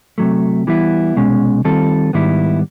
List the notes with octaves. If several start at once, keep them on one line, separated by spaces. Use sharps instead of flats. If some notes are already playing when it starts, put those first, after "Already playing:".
C3 D#3 F#3 A3
E3 G3 B3 E4
C2 B2 G#3 C#4
D#3 G3 C4 F4 A4
G#2 D#3 G3 B3 E4